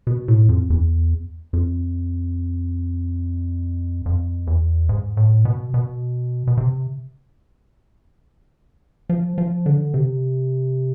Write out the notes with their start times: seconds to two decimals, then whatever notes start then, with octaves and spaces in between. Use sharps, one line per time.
0.07 B2
0.28 A2
0.49 F2
0.70 E2
1.53 F2
4.06 F2
4.47 E2
4.89 G#2
5.17 A2
5.45 B2
5.74 B2
6.47 B2
6.57 C3
9.09 F3
9.38 F3
9.66 D3
9.94 C3